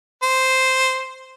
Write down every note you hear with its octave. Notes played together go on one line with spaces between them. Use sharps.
C5